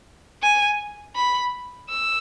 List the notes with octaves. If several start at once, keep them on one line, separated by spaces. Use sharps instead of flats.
G#5
B5
E6